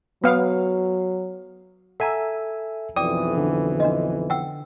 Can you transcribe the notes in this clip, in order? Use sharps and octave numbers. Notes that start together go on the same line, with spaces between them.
F#3 B3 F5
A4 E5 F#5 G#5 A#5
B1 F2 E3 D5 G5 D6 D#6
D3
D4 F#4 D#5
F#5 G5 E6